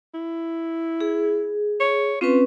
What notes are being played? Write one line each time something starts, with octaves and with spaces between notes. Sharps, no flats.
E4
G#4
C#5
C4 C#4 F4 B4